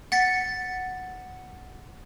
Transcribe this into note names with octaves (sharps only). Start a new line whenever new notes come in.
F#5 A6 B6 C#7